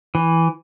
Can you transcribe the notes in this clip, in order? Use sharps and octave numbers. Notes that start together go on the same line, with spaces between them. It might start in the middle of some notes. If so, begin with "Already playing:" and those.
E3